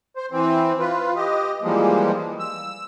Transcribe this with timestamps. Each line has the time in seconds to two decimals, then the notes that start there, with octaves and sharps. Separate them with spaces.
0.17 C5
0.32 E3 C4
0.79 F4 B4
1.16 G4 D#5
1.62 E3 F3 G3 G#3 A#3
2.39 E6